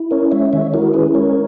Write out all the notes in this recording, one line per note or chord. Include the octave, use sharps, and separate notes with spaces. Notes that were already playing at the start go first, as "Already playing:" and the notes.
Already playing: E4
C#4 A#4 C#5
G#3 C#5 E5
D#3 C#5 E5
E4 F#4 A#4
C#4 G#4 B4
G#3 A#4 C#5